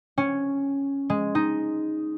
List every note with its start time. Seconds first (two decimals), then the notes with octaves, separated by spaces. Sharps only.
0.18 C#4
1.10 G#3
1.35 D#4